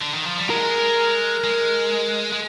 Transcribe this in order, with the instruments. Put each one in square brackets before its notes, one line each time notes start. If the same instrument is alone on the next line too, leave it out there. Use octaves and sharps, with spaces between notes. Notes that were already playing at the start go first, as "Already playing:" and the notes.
[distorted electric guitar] D3
D#3
F3
G3
[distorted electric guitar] G#3 [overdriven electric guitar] A#4
[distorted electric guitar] G#3
G#3